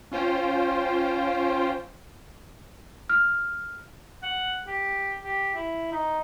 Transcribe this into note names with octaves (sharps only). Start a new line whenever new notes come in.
C#4 F4 C5 G5
F6
F#5
G4
G4
E4
D#4